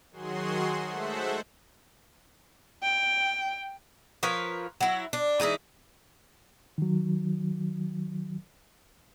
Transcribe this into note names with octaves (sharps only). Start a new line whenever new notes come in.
D#3 F#3 F#4 G#4 C6
G#3 A3 A4 C5 E5 F#5
G5
F3 A#4 B4 C#5
F#3 E4
D4
E3 G#3 D#4 E4
D#3 F#3